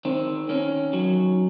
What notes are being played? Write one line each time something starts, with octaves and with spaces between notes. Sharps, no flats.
D#3 C4
D#3 C#4
F#3